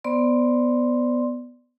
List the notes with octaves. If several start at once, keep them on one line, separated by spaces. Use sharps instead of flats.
B3 C5 D5 C6